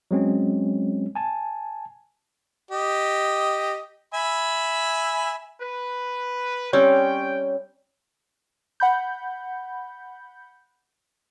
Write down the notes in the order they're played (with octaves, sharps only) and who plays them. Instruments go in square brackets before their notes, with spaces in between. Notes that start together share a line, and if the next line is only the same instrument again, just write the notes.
[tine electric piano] F#3 G#3 C4 C#4
G#5 A5
[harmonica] G4 D#5
E5 G#5 B5
[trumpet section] B4
[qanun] G3 C4 C#4 [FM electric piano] C#5 [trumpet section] G5
[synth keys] F#5 B5 G6